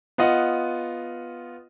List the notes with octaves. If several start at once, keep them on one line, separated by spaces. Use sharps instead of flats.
B3 F4 D#5 F#5